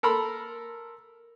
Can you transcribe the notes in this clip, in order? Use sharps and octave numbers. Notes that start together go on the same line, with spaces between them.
A4 A#4 B5 C6